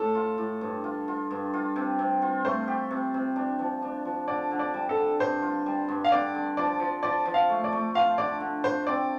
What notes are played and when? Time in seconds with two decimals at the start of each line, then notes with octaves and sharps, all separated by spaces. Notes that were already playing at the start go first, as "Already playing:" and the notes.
Already playing: A2 A4
0.15 F4
0.38 A2
0.61 G2
0.84 F4
1.08 F4
1.31 G2
1.54 F4
1.76 C3
1.99 C3
2.22 F4
2.45 A3 C5
2.68 G4
2.91 C3
3.14 C3
3.36 D4
3.59 F3
3.82 D4
4.05 F3
4.28 D3 D5
4.51 D3
4.59 D5
4.74 G3
4.89 A4
4.97 D3
5.19 G2 C5
5.42 F4
5.66 G3
5.88 G2
6.04 F5
6.12 D3 D5
6.35 D3
6.57 F3 D5
6.80 F3
7.03 F3 D5
7.26 F3
7.34 F5
7.49 A3
7.64 D5
7.73 A3
7.94 F4 F5
8.18 D3 D5
8.40 D3
8.64 F4 C5
8.87 C4 D5